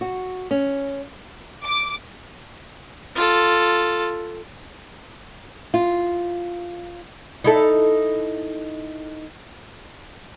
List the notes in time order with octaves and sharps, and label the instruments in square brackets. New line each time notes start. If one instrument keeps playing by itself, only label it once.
[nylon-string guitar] F#4
C#4
[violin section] D6
[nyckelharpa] F4 A4
[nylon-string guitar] F4
[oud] D#4 E4 A4